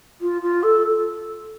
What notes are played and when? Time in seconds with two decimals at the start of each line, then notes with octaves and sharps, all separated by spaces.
0.21 F4
0.41 F4
0.63 A4